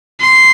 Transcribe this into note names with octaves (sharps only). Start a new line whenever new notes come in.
C6